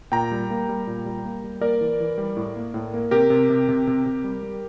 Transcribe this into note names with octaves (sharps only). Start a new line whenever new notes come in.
A#2 G5 A#5
G3
A#3
G3
A#2
G3
A#3
G3
A#3 A#4 D5
E3
E3
G3
A2
A#3
A2
A#3
C3 G4 A#4
C3
C3
C3
C3
C3
G3
G3